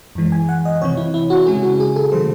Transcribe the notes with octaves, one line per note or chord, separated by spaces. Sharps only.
F#2 E3 G#3
G#5
F#5
D#5
C3 E3 C4 C#5
E4
E4
F#4
C#3 G#3 C#4 G#4
F#4
G#4
A4
C3 D#3 F#3 A3 C5